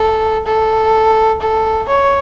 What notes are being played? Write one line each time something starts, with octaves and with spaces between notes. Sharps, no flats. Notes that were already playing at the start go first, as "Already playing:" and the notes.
Already playing: A4
A4
A4
C#5